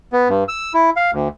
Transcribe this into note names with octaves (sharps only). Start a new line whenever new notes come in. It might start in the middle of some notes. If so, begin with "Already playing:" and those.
B3
G2
E6
E4
F5
D2